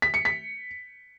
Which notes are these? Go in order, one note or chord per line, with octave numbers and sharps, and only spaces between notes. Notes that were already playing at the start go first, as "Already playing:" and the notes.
B6
C#7
B6